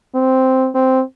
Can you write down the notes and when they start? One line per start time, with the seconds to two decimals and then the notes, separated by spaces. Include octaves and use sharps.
0.15 C4
0.75 C4